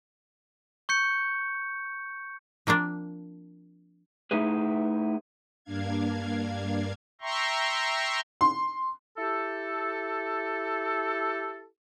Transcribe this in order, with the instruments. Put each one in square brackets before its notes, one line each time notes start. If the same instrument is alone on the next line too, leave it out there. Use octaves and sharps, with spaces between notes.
[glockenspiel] C#6 G6 C#7
[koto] F3 A#3 C4 D4
[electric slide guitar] A3 D#4 E4 G#4 B4
[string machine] G2 A#3 D4 F5 G#6
[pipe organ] E5 G5 A#5 C6 C#6
[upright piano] C6
[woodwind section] E4 G4 A4